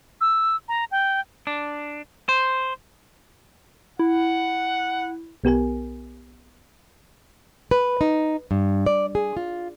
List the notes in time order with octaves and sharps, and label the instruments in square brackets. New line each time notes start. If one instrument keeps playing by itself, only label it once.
[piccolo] E6
A#5
G5
[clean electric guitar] D4
C5
[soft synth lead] E4 [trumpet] F#5
[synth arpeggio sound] B1 B3 G4 A#4 G#5
[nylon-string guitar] B4
D#4
G2
D5
G#4
F4